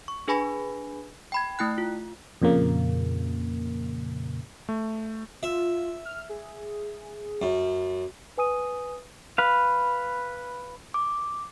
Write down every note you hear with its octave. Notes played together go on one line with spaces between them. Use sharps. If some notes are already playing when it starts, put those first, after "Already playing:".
C#6
D4 G#4 B4 G#5 B5 A#6
G5 B5 G#6
A3 E4 G5 F#6
F4
F2 A#2 C#3 A#3
A3
F4 E5
F6
G#4
F#2
B4 G#5 D#6 D#7
B4 F5 B5
D6